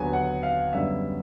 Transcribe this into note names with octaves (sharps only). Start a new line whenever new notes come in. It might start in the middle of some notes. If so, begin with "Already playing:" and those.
Already playing: D#2 D3 F#3 B3 G#5
F#5
F5
F#2 D3 G3 B3 E5